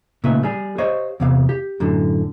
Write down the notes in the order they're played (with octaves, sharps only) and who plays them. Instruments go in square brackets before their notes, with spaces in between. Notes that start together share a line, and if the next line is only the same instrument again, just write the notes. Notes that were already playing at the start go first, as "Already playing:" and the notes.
[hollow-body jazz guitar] A#2 C#3 A3 D#4 B4 E5
G3 G#4
G4 C5 C#5 D#5 F5
E2 C3 F5
G4
F#2 A2 D3